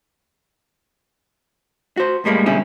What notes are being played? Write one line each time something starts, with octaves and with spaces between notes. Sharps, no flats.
F#4 C5
A2 G3 G#3 A#3
B2 D3 G3 C#4 E4 G#4